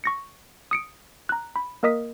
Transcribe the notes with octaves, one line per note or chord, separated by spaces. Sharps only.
C#6 A#6 C#7
D#6 C#7 D7
A#5 F#6
B5
A#3 A#4 D#5 D#6 B6